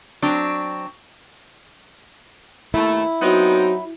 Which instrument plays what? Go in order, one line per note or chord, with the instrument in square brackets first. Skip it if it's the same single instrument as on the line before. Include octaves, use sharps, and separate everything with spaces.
[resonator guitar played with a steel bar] F#3 C4 D4
[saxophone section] D#2 A3 [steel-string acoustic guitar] E4
[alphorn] F#3 [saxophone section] B3 C4 D#4 [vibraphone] F#4